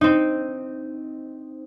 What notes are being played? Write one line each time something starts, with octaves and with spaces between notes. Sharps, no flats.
C4 D#4